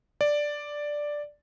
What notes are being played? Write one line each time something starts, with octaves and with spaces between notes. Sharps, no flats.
D5